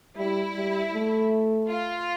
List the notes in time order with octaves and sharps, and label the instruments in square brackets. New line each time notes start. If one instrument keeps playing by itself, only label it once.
[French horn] G3 [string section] E4
[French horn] G3
A3
[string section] F4